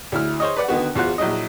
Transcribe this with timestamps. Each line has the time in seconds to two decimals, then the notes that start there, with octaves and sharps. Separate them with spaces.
0.12 D2 E4 F6
0.40 C5 C#5 D#5
0.57 B4 D5 F#5
0.68 D3 D#3 B3 F#4
0.95 E2 F4 F#4 C5 F#6
1.18 A#1 F#3 E4 D#5